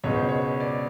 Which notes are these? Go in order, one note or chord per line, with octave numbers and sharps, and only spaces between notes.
C#2 B2 G#3 C#5
C5
C#5
D5